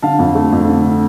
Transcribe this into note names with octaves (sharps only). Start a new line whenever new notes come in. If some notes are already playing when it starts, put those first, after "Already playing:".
D3 F5 A5
F2
A3
F2
D3